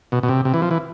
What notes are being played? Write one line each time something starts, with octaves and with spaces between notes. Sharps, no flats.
B2
B2
C3
C3
E3
F3
E3